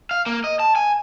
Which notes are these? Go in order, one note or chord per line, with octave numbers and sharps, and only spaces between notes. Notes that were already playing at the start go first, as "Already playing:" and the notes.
F5
A#3
D#5
A5
G#5